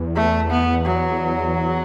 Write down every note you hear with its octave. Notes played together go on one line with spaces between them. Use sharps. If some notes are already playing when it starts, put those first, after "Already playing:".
Already playing: E2
A3
B3
F#3